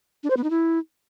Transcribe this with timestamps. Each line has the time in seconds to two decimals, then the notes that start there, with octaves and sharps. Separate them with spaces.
0.23 D4
0.30 C5
0.37 B3
0.44 D#4
0.50 E4